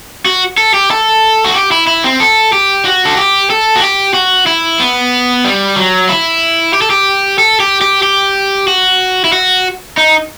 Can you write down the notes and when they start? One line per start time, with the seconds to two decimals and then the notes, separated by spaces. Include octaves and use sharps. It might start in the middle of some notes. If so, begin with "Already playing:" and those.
0.26 F#4
0.58 A4
0.74 G4
0.91 A4
1.44 F#4
1.55 G4
1.71 E4
1.87 E4
2.04 C4
2.20 A4
2.53 G4
2.85 F#4
3.05 A4
3.17 G4
3.50 A4
3.76 F#4
3.82 G4
4.14 F#4
4.46 E4
4.80 B3
5.44 G3
5.76 F#3
6.09 E4
6.74 G4
6.82 A4
6.90 G4
7.38 A4
7.60 G4
7.81 G4
8.03 G4
8.68 F#4
9.24 E4
9.33 F#4
9.97 D#4